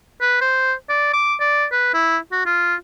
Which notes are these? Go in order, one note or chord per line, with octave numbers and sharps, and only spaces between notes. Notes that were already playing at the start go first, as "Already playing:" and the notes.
B4
C5
D5
D6
D5
B4
E4
F#4
F4